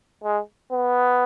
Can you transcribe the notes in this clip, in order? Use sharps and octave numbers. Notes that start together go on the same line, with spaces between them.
G#3
B3